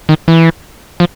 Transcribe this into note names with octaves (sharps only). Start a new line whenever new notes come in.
D#3
E3
F3